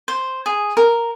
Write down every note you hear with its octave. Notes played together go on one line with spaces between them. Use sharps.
C5
G#4
A#4